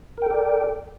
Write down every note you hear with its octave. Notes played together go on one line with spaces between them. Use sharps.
A4 A#4 D5 G5